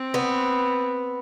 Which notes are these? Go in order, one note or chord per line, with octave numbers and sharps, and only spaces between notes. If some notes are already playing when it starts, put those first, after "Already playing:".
Already playing: C4
B3